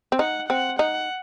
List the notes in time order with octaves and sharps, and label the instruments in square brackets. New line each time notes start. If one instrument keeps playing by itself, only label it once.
[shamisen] C4
[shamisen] D#4 [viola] F#5
[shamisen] C4 [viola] F#5
[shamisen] D#4 [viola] F#5